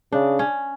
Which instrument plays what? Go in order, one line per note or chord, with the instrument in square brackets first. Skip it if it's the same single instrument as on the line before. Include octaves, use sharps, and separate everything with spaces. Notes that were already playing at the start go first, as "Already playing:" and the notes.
[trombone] C#3 [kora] D4
[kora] C#4